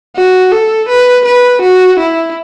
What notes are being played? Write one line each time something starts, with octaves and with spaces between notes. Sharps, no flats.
F#4
A4
B4
B4
F#4
E4